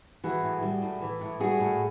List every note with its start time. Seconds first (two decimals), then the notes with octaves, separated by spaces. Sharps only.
0.24 E3 F#4 G#4
0.43 A2
0.62 G3
0.82 A2
1.01 E3
1.21 A2
1.40 G3 F#4 G#4
1.59 A2